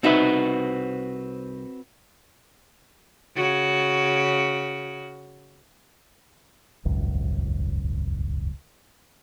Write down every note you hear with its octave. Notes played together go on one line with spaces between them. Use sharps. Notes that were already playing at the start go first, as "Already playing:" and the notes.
C2 C4 D#4 F#4 B4 E5
C#3 F#4
D#1 G#1 C#2 F#2